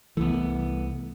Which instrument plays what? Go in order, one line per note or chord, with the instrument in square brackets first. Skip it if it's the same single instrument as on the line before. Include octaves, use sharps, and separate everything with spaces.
[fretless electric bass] C2 E3 [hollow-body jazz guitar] A3 B3